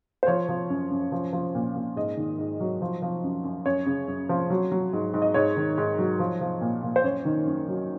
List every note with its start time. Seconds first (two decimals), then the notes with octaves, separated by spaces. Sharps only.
0.23 C5
0.27 F3 C#5
0.49 F3
0.70 F#2
0.91 F#2
1.12 F3
1.33 F3
1.55 A#2
1.76 A#2
1.96 G#2 D#5
2.17 D#3
2.39 G#2
2.60 F#3
2.82 F3
3.02 F3
3.24 F#2
3.44 F#2
3.66 F#2 C#5
3.86 C#3
4.08 F#2
4.29 F3
4.50 F#3
4.72 F#3
4.93 G#2
5.14 G#2
5.22 D#5
5.34 G#2 C#5
5.57 D#3
5.78 G#2
5.98 F#3
6.20 F3
6.41 F3
6.61 A#2
6.83 A#2
6.96 C5
7.04 F#2 C#5
7.25 D#3
7.47 F#2
7.68 F#3